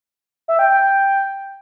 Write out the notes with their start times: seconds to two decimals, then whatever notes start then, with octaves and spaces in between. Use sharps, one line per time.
0.48 E5
0.59 G5
0.70 G5
0.80 G5